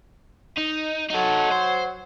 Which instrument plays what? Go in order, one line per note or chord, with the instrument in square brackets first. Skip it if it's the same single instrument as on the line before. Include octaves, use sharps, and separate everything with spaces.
[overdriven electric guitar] D#4
[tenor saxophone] F#3 [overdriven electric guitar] D#4 A4
[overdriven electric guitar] C5